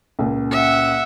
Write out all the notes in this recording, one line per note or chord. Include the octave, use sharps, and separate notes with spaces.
C#2 A#2
E5 F#5